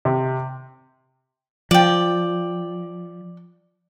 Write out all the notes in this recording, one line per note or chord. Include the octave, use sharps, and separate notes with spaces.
C3
F3 D5 G5